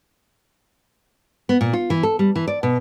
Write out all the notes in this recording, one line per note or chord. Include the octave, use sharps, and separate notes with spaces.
B3
A#2
F4
E3
A4
G3
E3
D5
B2